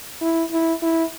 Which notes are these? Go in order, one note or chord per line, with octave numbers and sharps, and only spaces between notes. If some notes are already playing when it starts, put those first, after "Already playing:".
E4
E4
E4